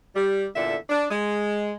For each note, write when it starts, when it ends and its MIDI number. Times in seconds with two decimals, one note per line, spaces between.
0.15 0.46 55
0.55 0.76 40
0.55 0.76 46
0.55 0.76 50
0.55 0.76 69
0.55 0.76 76
0.89 1.05 62
1.10 1.75 56